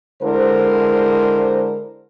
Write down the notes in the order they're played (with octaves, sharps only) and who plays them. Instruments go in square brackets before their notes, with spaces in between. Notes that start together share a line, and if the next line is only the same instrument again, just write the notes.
[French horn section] D3 G#3 E4 A#4 C5